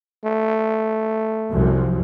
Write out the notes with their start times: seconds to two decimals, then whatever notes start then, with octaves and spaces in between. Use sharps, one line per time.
0.24 A3
1.51 C2 F#2 F3